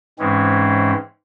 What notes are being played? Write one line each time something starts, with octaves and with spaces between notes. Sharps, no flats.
G#2 E3 G#3 C4 C#4